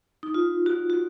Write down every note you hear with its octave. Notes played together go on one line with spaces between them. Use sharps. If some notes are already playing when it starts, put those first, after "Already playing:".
D#4
F4
F#4
F#4